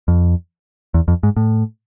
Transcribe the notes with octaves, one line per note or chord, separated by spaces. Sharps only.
F2
E2
F2
G#2
A2